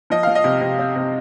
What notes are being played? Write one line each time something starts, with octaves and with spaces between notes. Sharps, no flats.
F3 D#5
F3 F5
D#5
C3
C3
C4
C3